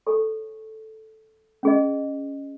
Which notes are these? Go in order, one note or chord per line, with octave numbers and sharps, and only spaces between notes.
A4 C#5 G#5 C#6
C#4 G#4 D#5